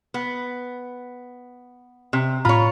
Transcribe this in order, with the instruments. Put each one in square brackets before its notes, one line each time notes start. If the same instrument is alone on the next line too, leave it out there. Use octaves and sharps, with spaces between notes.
[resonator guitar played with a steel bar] B3
C3
[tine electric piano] A2 A#5 B5 [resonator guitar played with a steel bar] F4 C#5